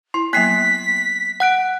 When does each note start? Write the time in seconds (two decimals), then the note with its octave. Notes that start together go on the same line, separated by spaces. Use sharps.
0.14 E4 C6
0.33 F#3 A#3 B3 F#6 B6 C7
1.40 F#5 F#6 D7